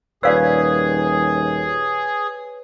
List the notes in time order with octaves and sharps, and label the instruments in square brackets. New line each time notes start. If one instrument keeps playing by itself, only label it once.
[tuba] D#1 [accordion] G#4 [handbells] B4 C#5 [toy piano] D5 F5 E6